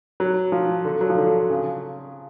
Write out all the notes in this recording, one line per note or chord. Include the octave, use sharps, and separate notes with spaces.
F#3
F3
D3
F#3
F3
D3
C#3